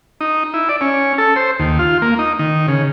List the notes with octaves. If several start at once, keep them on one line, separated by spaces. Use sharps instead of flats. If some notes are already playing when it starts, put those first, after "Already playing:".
D#4
E4
D5
C#4
A4
C5
D#2
F4
A#3
D#4
D#3
C#3